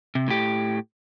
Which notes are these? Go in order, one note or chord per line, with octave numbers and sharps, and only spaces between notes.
C3
A2 G4